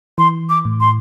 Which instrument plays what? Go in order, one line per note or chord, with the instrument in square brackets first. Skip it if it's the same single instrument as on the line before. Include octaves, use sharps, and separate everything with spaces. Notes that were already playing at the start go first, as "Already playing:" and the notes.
[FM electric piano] E3 [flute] C6
[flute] D6
[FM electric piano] A2
[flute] C6